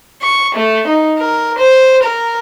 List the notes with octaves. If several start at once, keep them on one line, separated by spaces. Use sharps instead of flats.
C#6
A3
D#4
A#4
C5
A#4